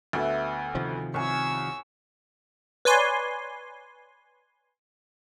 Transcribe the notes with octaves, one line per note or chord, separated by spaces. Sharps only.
D2 B3 E5
C3 D#3 F3
C2 C#5 G#5 C#6 E6
B4 C#5 D5 G#5 C6